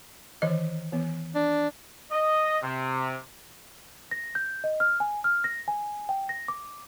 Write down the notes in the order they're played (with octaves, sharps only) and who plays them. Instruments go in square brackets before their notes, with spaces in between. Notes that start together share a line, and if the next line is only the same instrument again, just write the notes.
[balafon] D#3 E3 D#5
E3 B3
[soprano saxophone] D4
[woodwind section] D#5
C3
[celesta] A#6
G6
D#5
F6
G#5
F6
A#6
G#5
G5
A#6
D6